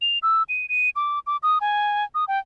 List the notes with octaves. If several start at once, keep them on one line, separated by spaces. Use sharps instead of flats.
F7
E6
D#7
D#7
D6
D6
D#6
G#5
D#6
G5